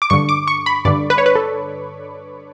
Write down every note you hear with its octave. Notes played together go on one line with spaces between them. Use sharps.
D6
G2 D3 C#6
D6
C#6
B5
G2 D3 D5
B4
C#5
B4
A4